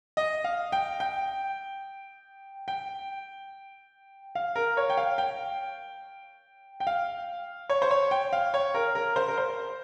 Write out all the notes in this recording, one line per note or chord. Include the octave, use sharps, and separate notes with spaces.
D#5
F5
G5
G5
G5
F5
A#4
C#5
G5
F5
G5
G5
F5
C#5
C5
C#5
G5
F5
C#5
A#4
A#4
C5
A#4
C5